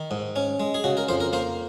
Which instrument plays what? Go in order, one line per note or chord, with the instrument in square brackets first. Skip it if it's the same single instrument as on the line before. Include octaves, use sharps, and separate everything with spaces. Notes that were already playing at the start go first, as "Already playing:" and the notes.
Already playing: [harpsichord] D#3
G#2
C#4
G#3
G#4
C#3 F#4
A#4
F2 C5
A#4
A#3 C5